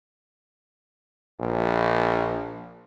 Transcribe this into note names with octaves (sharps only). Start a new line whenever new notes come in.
A#1